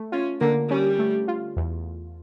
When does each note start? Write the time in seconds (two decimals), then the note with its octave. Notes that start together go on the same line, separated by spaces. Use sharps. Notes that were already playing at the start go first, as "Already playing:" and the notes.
Already playing: A3
0.12 C#4 F4
0.41 D3 A#3
0.70 G3 C#4
0.99 A3
1.28 F4
1.57 E2